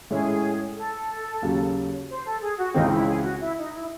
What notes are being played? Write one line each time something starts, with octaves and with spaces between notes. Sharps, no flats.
A2 G#3 C#4 E4 G#4
A4
D#2 C#3 F#3
C5
A4
G#4
F#4
C#2 C#3 E3 C4 D#4
E4
G#4
F#4
E4
D#4
E4